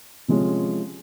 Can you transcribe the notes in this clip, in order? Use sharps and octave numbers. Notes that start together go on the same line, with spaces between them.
C3 F3 G#3 C#4